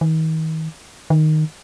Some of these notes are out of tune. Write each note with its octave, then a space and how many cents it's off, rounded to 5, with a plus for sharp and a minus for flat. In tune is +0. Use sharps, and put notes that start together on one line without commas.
D#3 +40
D#3 -5